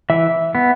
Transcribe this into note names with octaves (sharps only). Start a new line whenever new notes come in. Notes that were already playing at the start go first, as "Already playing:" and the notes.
E3 E5
B3